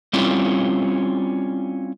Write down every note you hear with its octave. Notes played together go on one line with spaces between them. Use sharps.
G3 C4 C#4 E4 F4